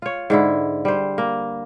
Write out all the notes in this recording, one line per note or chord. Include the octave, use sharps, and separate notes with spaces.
F4 C#5
G#2 D3 E4
G3 C5
A#3